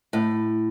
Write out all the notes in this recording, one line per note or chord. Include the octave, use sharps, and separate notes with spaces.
A2